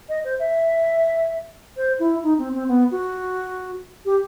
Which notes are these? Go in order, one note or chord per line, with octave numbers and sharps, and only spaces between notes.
D#5
C5
E5
C5
E4
D#4
C4
C4
B3
F#4
G4